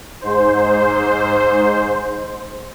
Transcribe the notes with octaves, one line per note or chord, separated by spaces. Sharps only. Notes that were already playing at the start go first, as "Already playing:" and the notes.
G#2 C5